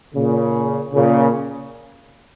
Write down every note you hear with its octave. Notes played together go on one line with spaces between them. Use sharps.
A#2 C#3
A#2 C#3